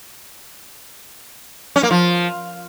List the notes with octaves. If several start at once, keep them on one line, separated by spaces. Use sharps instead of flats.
C#4
A#3
F3